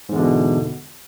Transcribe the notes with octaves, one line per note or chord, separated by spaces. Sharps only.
E2 G#2 B2 D3